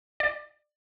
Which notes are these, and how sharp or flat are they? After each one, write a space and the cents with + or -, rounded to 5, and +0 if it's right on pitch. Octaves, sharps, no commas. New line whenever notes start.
D5 +30